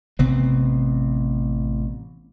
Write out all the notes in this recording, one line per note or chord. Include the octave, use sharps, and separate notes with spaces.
A1 C3 B3 C4